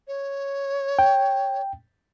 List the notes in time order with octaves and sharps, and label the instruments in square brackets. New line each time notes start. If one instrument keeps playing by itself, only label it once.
[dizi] C#5
[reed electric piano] G5